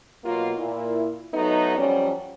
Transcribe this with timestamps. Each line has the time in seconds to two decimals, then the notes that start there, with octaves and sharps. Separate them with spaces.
0.25 B2 F#3 A#3 F4
0.58 A#2 E4
1.34 F#3 A3 B3 D#4
1.77 F2 F#3 G3 C#4